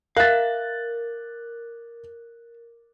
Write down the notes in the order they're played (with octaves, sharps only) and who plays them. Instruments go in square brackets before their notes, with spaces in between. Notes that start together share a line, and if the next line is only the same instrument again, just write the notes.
[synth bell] A#4 [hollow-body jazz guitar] E5 F5 [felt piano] F#6 A6